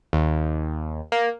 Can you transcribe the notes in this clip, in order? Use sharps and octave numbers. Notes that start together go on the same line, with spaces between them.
D#2
A#3